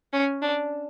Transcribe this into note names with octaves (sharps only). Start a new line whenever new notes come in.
C#4
D4